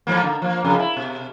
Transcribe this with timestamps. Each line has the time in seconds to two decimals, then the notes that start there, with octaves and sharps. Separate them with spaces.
0.07 G#2 F3 A#3
0.23 D3
0.42 F3 A#3
0.65 F2 C#3
0.79 E4
0.97 B2